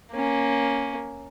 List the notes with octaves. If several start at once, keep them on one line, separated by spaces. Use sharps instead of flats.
A#3 C#4